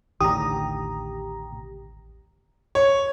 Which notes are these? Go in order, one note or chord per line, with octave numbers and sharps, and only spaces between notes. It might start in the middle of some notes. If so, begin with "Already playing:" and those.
A1 D#2 D3 G4 A#5 D#6
C#5